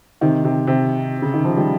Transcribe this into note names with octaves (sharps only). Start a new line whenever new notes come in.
C3 D#3
C3
C3
C#3
D#3
F3
D#3 G3